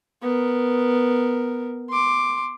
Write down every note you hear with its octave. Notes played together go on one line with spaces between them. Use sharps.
B3 A#4
C6 D6